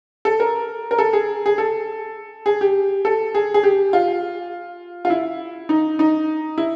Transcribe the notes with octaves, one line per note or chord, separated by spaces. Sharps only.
A4
A#4
A#4
A4
G#4
G#4
A4
G#4
G4
A4
G#4
G#4
G4
F4
F4
E4
D#4
D#4
E4